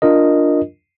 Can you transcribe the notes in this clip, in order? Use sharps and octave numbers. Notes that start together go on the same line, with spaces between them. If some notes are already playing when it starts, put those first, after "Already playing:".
D4 F4 A#4 D#5